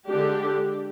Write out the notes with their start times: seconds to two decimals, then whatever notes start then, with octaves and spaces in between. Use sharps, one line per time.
0.09 D3 G#3 D4 G4